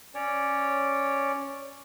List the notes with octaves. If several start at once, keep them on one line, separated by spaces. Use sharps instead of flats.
C#4 C#5 D5